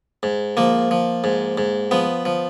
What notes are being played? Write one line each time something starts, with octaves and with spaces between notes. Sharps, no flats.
G#2
F3 A#3
F3
G#2
G#2
F3 B3
F3